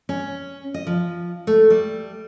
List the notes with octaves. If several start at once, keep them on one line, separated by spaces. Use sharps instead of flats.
C#4
D#5
F3
A3
G3